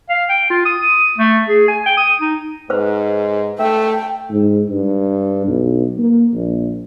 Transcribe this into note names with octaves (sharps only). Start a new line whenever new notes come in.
F5
G5
F4
D#6
A3
G#4
G#5
G5
D#6
D#4
G#2 B4 C5
A3 E5 G5
G#2
G2
B1
A#3
A#1